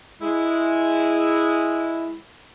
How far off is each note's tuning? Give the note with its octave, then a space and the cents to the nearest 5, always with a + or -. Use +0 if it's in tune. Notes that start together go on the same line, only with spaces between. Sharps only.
G#3 +0 E4 +0